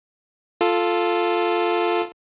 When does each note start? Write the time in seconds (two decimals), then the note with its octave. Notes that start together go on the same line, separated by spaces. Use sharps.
0.61 F4 A4